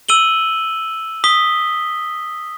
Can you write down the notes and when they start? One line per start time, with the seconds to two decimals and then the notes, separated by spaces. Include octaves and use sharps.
0.09 E6 D#7 F#7 G7
1.24 D#6 B6 G7